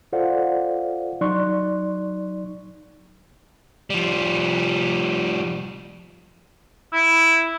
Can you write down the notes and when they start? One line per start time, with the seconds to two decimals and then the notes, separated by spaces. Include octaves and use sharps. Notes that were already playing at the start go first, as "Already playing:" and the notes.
0.13 F4 A4 C5 D5 F5 F#5
1.21 F#3 D#4 D5 C6 C#6 F#6
3.90 F3 G3
6.93 E4